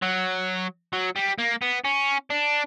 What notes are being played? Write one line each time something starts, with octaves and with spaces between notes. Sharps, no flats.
F#3
F#3
G3
A#3
B3
C#4
D4